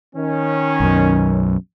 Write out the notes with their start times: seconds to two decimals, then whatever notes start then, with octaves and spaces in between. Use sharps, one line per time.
0.15 D#3 C#4
0.80 B1 F#2